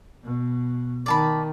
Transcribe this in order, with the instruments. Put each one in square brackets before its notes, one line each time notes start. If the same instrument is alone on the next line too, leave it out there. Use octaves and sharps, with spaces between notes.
[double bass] B2
[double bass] D#3 [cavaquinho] D5 A5 B5